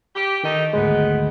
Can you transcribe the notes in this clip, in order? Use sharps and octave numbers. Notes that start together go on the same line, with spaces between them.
G4
D#3 A3 D#4
G#1 D2 G#3 B3